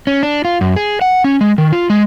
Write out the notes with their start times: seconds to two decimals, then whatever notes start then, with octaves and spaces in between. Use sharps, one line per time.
0.07 C#4
0.23 D4
0.45 F4
0.61 F#2
0.76 G#4
1.01 F#5
1.24 C#4
1.41 G#3
1.58 D#3
1.72 F4
1.90 G#3